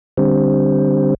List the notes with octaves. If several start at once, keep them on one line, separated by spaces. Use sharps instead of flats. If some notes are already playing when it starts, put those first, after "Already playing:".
D3 G3 C4